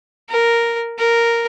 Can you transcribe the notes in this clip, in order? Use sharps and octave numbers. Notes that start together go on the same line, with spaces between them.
A#4
A#4